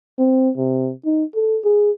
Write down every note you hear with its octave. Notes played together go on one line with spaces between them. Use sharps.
C4
C3
D#4
A4
G#4